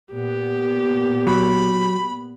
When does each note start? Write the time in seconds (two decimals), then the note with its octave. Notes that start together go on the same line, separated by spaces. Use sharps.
0.13 A#2 B3 G4
1.27 F#3 B5